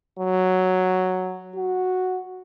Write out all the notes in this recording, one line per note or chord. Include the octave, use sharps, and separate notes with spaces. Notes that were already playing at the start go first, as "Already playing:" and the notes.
F#3
F#4